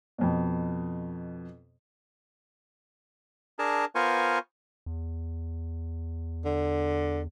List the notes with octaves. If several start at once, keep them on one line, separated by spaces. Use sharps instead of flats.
F2 B2
D4 G#4 A#4 A5
B3 F4 A#4 C5 G#5 C#6
E2
D3